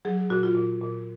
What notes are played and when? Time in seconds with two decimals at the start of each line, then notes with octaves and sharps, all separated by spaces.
0.05 F#3 G#4
0.17 G#4
0.30 A#2 F#4
0.43 F4
0.55 A#2
0.81 A#2